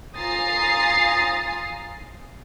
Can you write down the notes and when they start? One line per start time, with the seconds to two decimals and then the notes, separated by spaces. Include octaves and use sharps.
0.16 F4 G#5 A#5 D#6 A6 C7